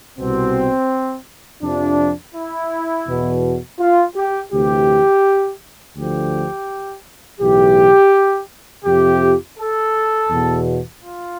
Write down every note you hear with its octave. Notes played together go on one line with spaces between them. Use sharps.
C2 B2 C4
F2 C3 F3 D4
E4
E2 B2
F4
G4
D2 C3 E3 G4
D2 D3 F3 G4
B1 A2 E3 G4
F2 C3 F3 G4
A4
E2 B2
F4